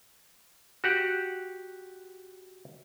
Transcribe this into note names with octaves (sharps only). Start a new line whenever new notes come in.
F#4 G4 F#5